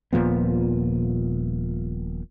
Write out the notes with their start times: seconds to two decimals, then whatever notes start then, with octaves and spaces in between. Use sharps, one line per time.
0.13 D#1 A#2 F3 B3